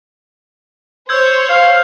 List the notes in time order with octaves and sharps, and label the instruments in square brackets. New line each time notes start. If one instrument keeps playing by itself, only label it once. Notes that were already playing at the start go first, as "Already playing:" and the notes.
[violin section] C5 C#5 [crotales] E6 G6 G#6
[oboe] F5